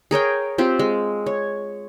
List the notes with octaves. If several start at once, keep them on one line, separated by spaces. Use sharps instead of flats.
G#4 A#4 C#5 G5
C4 F4 G4
G#3
C#5